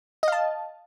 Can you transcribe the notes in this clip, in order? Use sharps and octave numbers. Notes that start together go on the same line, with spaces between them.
D#5 F5 A5